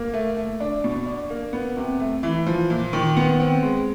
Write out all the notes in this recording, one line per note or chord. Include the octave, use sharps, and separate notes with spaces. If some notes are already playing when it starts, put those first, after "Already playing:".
Already playing: A#3
A3
A3
D4
B2
D4
A#3
B3
C3
A3
E3
F3
A#2
D#3
B3
C4
G#3